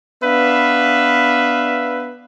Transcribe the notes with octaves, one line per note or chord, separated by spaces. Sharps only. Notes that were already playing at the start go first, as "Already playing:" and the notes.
B3 D4 B4 E5 F5